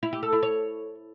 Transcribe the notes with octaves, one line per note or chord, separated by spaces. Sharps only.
E4
G4
A4
E4
C#5